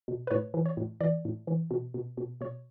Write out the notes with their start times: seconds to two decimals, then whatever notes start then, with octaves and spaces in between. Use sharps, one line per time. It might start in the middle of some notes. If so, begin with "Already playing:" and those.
0.08 B2
0.27 B4
0.31 A2 C#5
0.54 E3
0.66 C#5
0.77 A2
1.01 E3 D5
1.25 A2
1.47 E3
1.71 B2
1.94 B2
2.17 B2
2.41 B2 C#5